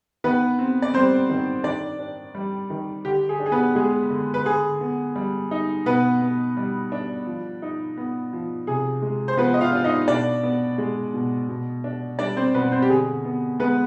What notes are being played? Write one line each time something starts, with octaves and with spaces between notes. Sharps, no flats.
D#3 B3 B4
C4
D5
G3 C4 C5
D#3
D#3 D4 D5
D4
G3
D#3
D3 G4
G#4
D4
G#4
B3 B4
G#3 G#4
D3
B4
D3 G#4
B3
G3
D#4
B2 B3 B4
B3
G3
D4
F3
D#4
B3
F3
C3 G#4
G#3
C5
F3 B3 B4
D#5
F4 F5
D4
D#4 D#5
B2 D4 D5
B3
G#3
B2
B2
D4
G3 D4 D5
C4 C5
B2 B3 B4
C4 C5
G4
D3 G#4
B3
G#3 B3 B4